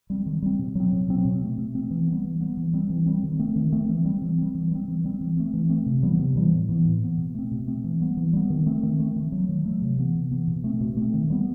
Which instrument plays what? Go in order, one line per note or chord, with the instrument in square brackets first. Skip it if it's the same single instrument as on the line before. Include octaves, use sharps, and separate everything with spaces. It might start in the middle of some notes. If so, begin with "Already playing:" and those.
[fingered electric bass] G3 C4
D#3
G3 C4
B2
F#3 C4
B2
F#3 C4
B2
A3 C4
B2
A3 C4
E3
G3 B3
E3
G3 B3
E3
G3 C4
E3
G3 C4
D#3
A3 C4
D#3
A3 C4
E3
G3 C4
E3
G3 C4
E3
G3 C4
E3
G3 C4
E3
A3 C4
E3
A3 C4
C3
E3 G3 B3
C3
E3 G3 B3
A2
E3 B3
A2
E3 B3
B2
A3 C4
B2
A3 C4
E3
G3 B3
E3
G3 B3
D#3
A3 C4
D#3
A3 C4
D#3
F#3 A3
D#3
F#3 A3
C3
E3 B3
C3
E3 B3
B2
A3 C4
B2
A3 C4
D#3
G3 B3